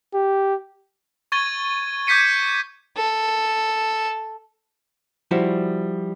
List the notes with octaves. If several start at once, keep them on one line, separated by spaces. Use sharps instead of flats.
G4
C#6 G#6 A6 D#7 G7
D6 G6 G#6 B6 C#7 D#7
A4
F3 G3 E4 F#4